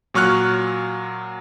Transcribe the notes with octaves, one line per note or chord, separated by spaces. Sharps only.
A#2 F#3 C#6 F6 F#6